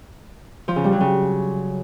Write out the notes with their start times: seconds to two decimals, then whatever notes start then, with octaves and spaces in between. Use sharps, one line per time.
0.68 F3
0.76 C#3
0.84 G3
0.92 F#3
1.01 C#3